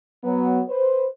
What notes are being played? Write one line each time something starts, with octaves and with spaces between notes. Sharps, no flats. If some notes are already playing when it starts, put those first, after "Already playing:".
F#3 B3
B4 C5